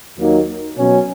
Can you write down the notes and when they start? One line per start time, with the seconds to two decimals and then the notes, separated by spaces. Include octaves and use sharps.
0.17 D#2 D#3 F#3 A#3 D#4
0.77 B2 F#3 C#4